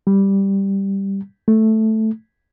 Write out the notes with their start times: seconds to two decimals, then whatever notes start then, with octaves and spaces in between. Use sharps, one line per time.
0.07 G3
1.48 A3